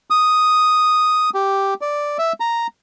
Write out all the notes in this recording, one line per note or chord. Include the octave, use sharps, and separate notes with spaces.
D#6
G4
D5
E5
A#5